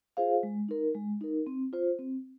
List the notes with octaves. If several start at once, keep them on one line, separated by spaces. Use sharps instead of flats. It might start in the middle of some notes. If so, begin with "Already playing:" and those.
F4 G#4 C5 F5
G#3
D#4 A#4
G#3
D#4 A#4
C4
F4 C5
C4